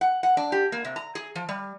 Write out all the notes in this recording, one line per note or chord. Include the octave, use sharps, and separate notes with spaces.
F#5
F#5
D4
G4
A#3
C3
A#5
G#4
F3
G3